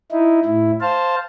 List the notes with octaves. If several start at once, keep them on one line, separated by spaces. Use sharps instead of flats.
D#4 E4
A2 E4
C5 F5 A5